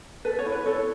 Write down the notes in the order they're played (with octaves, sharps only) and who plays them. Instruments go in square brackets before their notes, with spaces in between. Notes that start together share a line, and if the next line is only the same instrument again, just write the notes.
[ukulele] A4 B4
C#5
E4
B4
A4 C#5